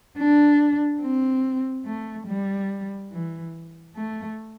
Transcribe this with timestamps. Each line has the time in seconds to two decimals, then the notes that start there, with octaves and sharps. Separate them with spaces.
0.18 D4
1.02 C4
1.86 A3
2.27 G3
3.12 E3
3.96 A3